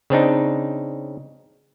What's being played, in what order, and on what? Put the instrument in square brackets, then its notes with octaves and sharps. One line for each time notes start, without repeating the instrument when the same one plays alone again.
[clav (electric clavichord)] C#3 C4 D4 D#4